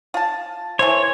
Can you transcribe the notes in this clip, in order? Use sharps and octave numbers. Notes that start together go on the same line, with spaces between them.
F4 A5
E3 A4 C5 C#5